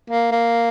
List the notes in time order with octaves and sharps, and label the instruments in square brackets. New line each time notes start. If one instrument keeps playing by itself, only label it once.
[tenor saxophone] A#3
A#3